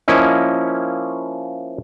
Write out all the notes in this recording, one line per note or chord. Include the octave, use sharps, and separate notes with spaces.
F3 A#3 C#4 E4 D#5